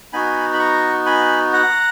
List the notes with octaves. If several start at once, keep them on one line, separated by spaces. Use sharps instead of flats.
B3 D#4 F#4 G#5 B5
B5
A#5 C#6
G#5 B5
F#5 A#5